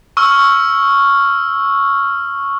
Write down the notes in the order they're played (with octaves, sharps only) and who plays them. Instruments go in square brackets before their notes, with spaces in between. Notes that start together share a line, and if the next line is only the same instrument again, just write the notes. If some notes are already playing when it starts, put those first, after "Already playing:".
[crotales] C#6 E6 F6